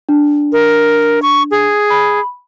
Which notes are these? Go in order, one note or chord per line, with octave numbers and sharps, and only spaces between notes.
D4
A#4
C#6
G#4
B5